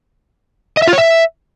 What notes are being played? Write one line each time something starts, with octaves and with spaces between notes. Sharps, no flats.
D#5
E5
F4
C#5
E5